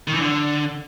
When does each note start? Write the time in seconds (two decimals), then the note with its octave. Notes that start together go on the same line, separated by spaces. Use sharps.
0.08 D#3
0.14 E3
0.21 D3